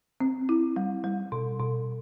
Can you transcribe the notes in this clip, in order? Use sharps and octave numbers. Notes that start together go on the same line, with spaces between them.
C4
E4
G3
G3
B2
B2